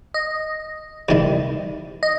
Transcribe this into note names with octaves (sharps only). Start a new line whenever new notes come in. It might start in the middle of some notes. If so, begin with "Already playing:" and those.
D#5
E2 C3 D#3 G3
D#5